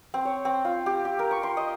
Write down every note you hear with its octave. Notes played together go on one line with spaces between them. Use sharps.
C4
C#5
C4
F4
G4
G4
A#4
C#6
C6
D#5